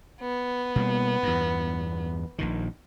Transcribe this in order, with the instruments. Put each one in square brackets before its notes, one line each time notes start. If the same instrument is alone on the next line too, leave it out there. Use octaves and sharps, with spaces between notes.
[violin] B3
[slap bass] B2 G3 A#3
E2 G2
A#1 A#2 D#3